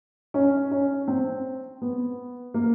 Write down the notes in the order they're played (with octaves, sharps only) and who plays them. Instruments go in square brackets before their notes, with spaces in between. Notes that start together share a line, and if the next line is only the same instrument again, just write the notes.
[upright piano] C#4
C#4
C4
B3
A#3